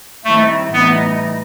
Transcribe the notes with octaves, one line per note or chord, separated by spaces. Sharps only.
D#3 G3 A3 C4 E4
A2 E3 G3 B3 D#4